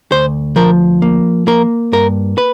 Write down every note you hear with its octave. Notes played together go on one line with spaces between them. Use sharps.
D2 C5
F3 A#4
A#3
A#3 A#4
G2 A#4
B4